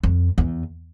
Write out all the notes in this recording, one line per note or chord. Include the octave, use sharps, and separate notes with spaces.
F2
E2